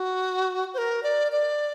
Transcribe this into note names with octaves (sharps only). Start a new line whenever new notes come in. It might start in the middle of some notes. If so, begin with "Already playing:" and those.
Already playing: F#4
C5
A#4
D5
D5